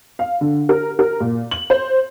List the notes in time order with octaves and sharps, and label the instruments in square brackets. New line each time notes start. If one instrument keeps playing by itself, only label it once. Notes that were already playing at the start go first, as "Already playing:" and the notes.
[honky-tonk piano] F5
D3
A#4
A#4
A#2
F#7
C5